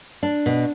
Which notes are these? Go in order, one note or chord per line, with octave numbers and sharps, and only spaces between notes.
D4
B2